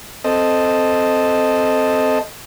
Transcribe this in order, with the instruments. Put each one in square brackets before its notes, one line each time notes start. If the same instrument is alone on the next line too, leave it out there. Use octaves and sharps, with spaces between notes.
[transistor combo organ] C4 A4 D#5